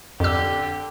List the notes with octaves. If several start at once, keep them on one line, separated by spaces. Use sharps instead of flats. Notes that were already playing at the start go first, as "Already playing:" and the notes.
F2 D3 G4 E6